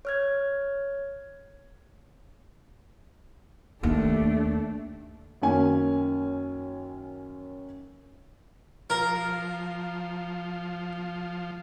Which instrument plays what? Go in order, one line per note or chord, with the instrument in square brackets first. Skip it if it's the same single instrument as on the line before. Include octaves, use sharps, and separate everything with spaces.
[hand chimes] C#5 F6 G#6
[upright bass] D#2 [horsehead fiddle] A3 D4
[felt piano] F#2 D#3 A#3 C#4 G#5
[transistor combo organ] F3 [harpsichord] A#4